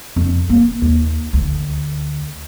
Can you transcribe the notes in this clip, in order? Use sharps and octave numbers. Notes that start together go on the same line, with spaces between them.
F2
A#3
D#2
D2